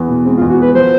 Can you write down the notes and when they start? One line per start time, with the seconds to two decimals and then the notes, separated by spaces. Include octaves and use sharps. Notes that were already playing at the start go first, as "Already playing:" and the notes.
Already playing: E2 B3
0.09 B2
0.25 G#3 C4
0.37 F4
0.41 E2
0.50 F#4
0.58 B3 B4
0.74 F3 C5